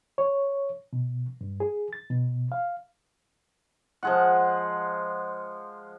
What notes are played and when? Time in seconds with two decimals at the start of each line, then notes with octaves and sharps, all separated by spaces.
0.18 C#5
0.93 B2
1.41 G2
1.60 G#4
1.93 A6
2.10 B2
2.52 F5
4.03 F3 G#3 F#5